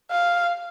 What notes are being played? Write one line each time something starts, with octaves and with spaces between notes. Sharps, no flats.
F5